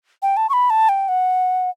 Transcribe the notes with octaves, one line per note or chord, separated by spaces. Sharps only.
G5
A5
C#6
B5
A5
G5
F#5